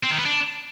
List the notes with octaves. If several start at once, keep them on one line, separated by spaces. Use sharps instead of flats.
C4
D#3
B3
D4